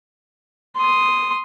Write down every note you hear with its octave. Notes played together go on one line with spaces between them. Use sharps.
C6 D#6